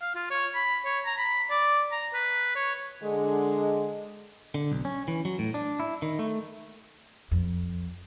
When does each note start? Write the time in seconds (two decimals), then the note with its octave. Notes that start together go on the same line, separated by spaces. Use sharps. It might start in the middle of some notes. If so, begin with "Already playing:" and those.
0.01 F5
0.15 F4
0.30 C#5
0.55 B5
0.85 C#5
1.05 A#5
1.18 B5
1.50 D5
1.92 A#5
2.14 B4
2.56 C#5
3.03 D3 G#3
4.54 D3
4.72 B1
4.85 C#4
5.08 E3
5.25 F#3
5.39 A2
5.54 D4
5.80 E4
6.02 D#3
6.19 A3
7.31 F2